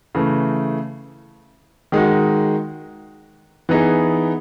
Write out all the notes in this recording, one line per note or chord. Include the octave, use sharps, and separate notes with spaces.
C#3 E3 A3
D#3 G#3 D#4 F#4
E3 B3 D#4 G#4